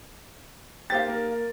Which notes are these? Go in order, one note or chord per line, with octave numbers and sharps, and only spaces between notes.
A#3 D#4 G4 C5 F5 G5 A6
A#3 A#4